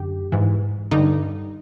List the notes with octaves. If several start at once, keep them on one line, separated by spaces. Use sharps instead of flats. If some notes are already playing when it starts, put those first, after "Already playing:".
Already playing: F#2 D3 G4
G#2 E3
G2 D3 D#4